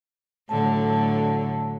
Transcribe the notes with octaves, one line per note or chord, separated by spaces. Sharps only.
A2 D3 F#3 A5